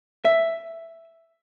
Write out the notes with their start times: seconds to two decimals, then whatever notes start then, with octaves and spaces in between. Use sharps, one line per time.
0.25 E5